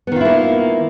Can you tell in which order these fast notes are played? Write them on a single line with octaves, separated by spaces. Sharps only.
B3 D#3 F4 E4 A#3